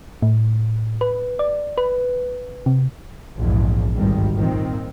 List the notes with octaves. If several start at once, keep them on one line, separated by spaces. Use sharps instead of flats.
A2
B4
D5
B4
C3
A#1 E2 G#2
G#1 D2 G2 D#3 G3
A#2 D#3 C4